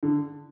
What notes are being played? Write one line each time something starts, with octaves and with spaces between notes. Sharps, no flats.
D3